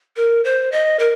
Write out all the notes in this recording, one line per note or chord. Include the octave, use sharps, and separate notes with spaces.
A#4
C5
D#5
A#4